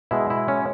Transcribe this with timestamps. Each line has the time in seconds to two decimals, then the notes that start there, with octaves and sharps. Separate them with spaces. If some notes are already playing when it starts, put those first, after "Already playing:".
0.11 B2 G#3 E4
0.30 E4
0.48 C#4